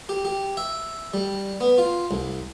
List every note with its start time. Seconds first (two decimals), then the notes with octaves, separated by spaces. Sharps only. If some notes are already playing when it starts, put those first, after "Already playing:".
0.09 G4
0.25 G4
0.57 E5
1.14 G3
1.61 B3
1.78 F4
2.11 C2